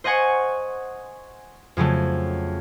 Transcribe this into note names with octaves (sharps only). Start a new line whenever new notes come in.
C5 D#5 F#5 G#5 C#6
F2 C#3 F#3 A3